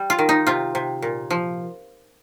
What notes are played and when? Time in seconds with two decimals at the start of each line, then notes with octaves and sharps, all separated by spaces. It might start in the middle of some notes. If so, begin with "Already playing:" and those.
Already playing: G3
0.10 F4
0.19 D#3
0.29 D#4
0.47 C3 F4
0.75 C3
1.02 A#2
1.30 F3